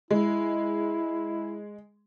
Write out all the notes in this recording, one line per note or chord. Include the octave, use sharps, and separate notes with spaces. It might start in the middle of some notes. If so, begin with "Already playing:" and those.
G#3 E4